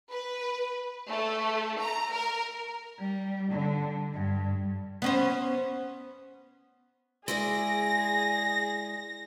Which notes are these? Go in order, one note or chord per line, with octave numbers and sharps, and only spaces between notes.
B4
A3
A#5
A#4
G3
D3
G2
B3 C#4 C5
G#3 E4 G#4 D5 A#6